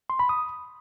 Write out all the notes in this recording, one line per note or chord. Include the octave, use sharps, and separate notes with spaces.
C6
B5
D#6